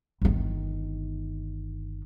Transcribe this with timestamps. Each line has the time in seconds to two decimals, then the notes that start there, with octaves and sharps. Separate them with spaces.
0.22 G1 D#3